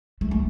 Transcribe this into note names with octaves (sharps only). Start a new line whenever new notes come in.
A3
A3